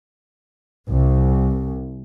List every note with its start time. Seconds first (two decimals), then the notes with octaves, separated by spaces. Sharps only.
0.90 C2